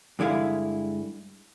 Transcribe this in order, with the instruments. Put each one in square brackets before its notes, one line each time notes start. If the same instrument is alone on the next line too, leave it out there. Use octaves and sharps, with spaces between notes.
[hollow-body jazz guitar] G2 D3 G#3 E4 F5